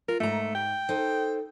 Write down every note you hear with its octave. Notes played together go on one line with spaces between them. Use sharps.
F4 A#4
G#2 A3 A#5
G5
D#4 A4 C5